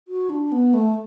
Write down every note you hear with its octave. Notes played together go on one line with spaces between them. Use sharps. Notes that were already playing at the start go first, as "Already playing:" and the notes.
F#4
D4
B3
A3